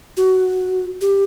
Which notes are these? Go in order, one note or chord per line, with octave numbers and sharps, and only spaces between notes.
F#4
G4